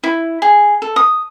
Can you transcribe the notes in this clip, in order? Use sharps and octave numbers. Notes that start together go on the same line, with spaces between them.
E4
G#4
A4
D#6